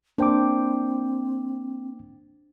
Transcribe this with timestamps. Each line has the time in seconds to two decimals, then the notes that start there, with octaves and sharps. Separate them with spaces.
0.18 A#3 C4 D4 C5 G5 D6